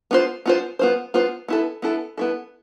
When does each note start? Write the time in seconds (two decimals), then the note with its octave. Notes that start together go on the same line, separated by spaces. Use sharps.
0.11 B3 F4 C5
0.46 B3 F4 C5
0.79 B3 F4 C5
1.14 B3 F4 C5
1.48 B3 E4 A4
1.82 B3 E4 A4
2.18 B3 E4 A4